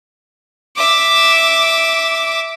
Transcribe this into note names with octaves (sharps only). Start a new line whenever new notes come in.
E5 D6